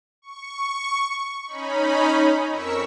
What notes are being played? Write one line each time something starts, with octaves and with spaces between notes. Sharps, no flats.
C#6
C#4 D#4 B5
F2 A#4 C#6 E6 B6 C#7